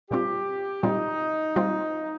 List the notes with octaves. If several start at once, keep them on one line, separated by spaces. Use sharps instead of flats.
A#2 G3 C4 F4 G4
A#2 G3 C4 D#4 F4
A#2 G3 C4 F4